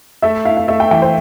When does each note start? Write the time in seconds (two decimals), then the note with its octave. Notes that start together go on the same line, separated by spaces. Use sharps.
0.22 A3 E5
0.45 E4 F5
0.57 F5
0.68 A3 E5
0.80 G5
0.91 E3 G5
1.02 C5